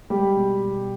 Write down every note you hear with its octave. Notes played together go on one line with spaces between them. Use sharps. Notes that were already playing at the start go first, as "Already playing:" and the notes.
G3 G#3 G4
B2
B2